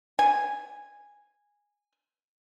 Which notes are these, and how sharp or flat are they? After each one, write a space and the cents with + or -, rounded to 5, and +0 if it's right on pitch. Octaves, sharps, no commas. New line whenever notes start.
G#5 -10